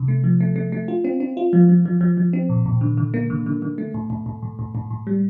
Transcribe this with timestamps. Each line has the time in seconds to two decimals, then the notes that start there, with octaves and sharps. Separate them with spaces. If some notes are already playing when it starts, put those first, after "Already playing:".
Already playing: C3
0.08 A3
0.24 F3
0.41 A3
0.56 A3
0.72 A3
0.88 F4
1.04 C4
1.20 C4
1.37 F4
1.53 F3
1.69 F3
1.86 F3
2.01 F3
2.17 F3
2.33 C4
2.49 A#2
2.66 A#2
2.81 D3
2.97 D3
3.14 A#3
3.30 D3
3.46 D3
3.62 D3
3.78 A3
3.94 A2
4.10 A2
4.26 A2
4.43 A2
4.59 A2
4.75 A2
4.91 A2
5.07 G3